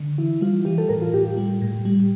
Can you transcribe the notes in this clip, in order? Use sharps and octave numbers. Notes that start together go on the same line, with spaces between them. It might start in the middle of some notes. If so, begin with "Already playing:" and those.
Already playing: D3
E3 E4
G3 F4
E3 G4
A4
A2 A#4
F4
A2 G4
G3
A2
G3